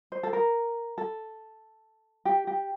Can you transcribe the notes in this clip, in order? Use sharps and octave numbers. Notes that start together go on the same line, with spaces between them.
C5
A4
A#4
A4
G4
G4